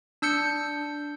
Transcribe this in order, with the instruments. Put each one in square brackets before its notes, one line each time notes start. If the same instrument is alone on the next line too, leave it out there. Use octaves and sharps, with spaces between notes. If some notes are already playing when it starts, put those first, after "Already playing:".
[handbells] D4 E6 G6 C#7